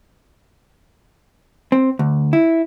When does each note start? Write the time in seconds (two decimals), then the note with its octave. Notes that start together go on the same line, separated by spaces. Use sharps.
1.72 C4
1.99 D2
2.33 E4